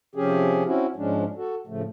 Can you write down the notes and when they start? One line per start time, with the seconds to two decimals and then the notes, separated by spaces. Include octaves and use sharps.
0.15 C3 F3 C#4 G4 G#4
0.66 C4 C#4 E4 F#4
0.96 G#2 F3 G#3 C#4 D4
1.36 F#4 A4
1.67 A2 C#3 F3 A3